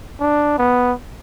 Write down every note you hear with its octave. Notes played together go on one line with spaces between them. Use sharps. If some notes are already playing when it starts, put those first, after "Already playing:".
D4
B3